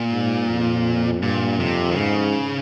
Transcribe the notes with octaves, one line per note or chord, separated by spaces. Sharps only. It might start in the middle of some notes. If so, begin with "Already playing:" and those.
Already playing: A#2
G#2
F2
G2 A#2
F2 C3
D#3
G#2 C#3